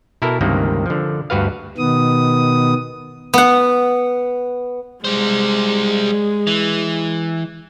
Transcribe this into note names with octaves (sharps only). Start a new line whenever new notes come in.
B2 E4 A4 A#4
C#2 G2 C3 D#3 A#3
D3 F3
D2 G2 F#4 B4 F5
B2 D#3 B3 D#6
B3 F#5
G3 G#3 C5
E3